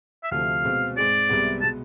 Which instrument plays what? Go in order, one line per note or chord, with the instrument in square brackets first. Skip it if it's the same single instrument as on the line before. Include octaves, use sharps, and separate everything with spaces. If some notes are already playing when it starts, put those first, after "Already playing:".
[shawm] E5
[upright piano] D2 C3 F3 A3 [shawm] F5
[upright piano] B2 G#3 C4
[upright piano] G#2 G#3 C4 G#4 [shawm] D5
[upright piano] C2 C3 G#3 B3
[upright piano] B2 G#3 B3 [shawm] A5